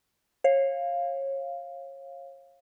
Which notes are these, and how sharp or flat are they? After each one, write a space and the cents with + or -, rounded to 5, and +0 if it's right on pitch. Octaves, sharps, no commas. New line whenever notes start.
C#5 -30 F5 +0